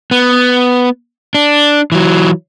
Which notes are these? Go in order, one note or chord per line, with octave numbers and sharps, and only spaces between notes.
B3
D4
E3 F#3